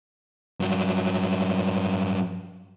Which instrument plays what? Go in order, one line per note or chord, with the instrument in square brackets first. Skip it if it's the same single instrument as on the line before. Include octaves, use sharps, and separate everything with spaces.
[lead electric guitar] G2 F#3